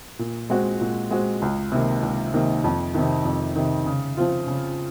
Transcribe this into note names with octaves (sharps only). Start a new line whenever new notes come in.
A#2
G#3 C4 F#4
A#2
G#3 C4 F#4
C#2
C3 D#3 A#3
C#2
C3 D#3 A#3
F2
C3 D#3
F2
C3 D#3
C#3
F3 C4 F4
C#3